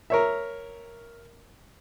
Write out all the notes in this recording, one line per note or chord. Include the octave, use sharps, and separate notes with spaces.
A#4 C#5 E5